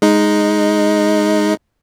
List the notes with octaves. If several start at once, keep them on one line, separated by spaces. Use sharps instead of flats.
G#3 D#4